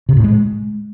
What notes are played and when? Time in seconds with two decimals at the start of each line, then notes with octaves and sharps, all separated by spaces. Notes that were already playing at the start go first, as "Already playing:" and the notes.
0.09 C3
0.16 A2
0.24 G#3